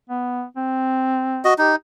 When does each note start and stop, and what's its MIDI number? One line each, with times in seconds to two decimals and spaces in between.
0.10 0.44 59
0.56 1.45 60
1.45 1.54 66
1.45 1.54 75
1.58 1.76 63
1.58 1.73 67